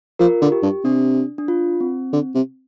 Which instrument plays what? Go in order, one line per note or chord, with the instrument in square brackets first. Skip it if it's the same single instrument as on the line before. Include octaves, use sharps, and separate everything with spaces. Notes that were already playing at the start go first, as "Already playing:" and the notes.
[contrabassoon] F3 [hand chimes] F4 A#4
[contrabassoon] D3
[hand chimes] G4
[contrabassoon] G2
[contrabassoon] C3 [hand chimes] D4
[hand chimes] D4
F4
C4
[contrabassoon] D3
C3